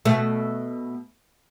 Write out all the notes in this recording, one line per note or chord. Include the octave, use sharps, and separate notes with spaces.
B2 A3